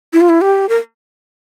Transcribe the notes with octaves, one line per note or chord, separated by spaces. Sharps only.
E4
F4
E4
G4
A#4